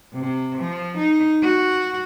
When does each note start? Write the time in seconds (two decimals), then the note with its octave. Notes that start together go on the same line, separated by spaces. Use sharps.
0.14 C3
0.59 F3
0.98 D#4
1.43 F#4